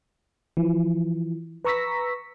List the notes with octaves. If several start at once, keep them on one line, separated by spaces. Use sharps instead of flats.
E3 F3
B4 A#5 C#6 E6 A#6 B6